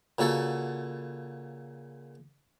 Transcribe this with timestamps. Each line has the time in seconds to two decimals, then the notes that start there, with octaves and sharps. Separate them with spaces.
0.19 A#2 C#3 F#4 A4 F#5